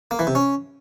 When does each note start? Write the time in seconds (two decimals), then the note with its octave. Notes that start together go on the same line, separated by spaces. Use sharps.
0.11 A#3
0.19 E3
0.27 C3
0.35 C#4